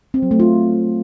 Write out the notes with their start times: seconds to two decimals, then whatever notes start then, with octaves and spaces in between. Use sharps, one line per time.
0.14 C4
0.23 F#3
0.31 A3
0.40 F4